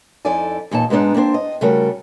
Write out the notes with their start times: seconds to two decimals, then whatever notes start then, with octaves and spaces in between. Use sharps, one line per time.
0.25 F2 D#4 E4 A4 D5 G#5
0.71 E2 A#2 D#4 A5
0.90 G#2 G#3 B3 D4 D#4
1.14 A#3 C4 D4 C5
1.34 D#5
1.61 C#3 G3 A3 F#4 A#4